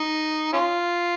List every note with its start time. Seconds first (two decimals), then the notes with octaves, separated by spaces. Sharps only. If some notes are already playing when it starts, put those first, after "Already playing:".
Already playing: D#4
0.53 C#4 F4